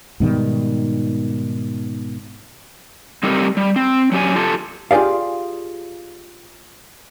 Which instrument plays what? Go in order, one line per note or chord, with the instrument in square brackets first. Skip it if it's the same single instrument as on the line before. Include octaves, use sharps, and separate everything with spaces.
[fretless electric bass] G#2 B2 D#3 G3
[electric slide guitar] G3 A3 C4 D#4 G4 A#4
G3
C4
F#3 C#4 G4 D5 G#5
F4 G4 A4
[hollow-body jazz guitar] F4 G4 G#4 D5 F5